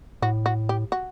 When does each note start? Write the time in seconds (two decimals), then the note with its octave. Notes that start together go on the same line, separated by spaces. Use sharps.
0.22 A2 F#4
0.46 F#4
0.69 G4
0.92 F#4